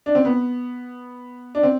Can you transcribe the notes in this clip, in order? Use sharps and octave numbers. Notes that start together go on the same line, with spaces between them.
D4
C4
B3
D4
C4